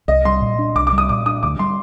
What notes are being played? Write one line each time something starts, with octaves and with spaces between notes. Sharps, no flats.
C2 D#5
G3 C6
A#2
D4
C2 D6
D6
G3
D#6
A#2 D6
D4 D#6
D2 D6
G3 C6